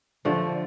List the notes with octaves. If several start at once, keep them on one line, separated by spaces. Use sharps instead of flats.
D3 F3 A3